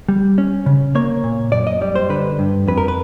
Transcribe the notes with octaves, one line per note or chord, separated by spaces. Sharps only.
G3
C#4
C#3
A#3 C#5
A#2
F#2 D5
D#5
G3 D5
C5
D3 B4
G2
F2 B4
A#4
B4